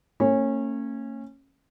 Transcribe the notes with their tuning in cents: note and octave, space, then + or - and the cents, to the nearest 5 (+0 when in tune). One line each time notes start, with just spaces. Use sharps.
A#3 -45 C#4 -20